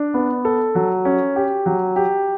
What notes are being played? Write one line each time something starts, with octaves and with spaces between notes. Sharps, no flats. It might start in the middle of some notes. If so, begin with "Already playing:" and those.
Already playing: D4
B3
A4
F#3
C#4
G4
F#3
G4